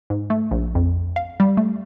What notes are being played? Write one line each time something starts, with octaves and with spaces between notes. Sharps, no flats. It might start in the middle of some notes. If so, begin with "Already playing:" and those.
G#2
A3
A#1
F2
F5
G3
A3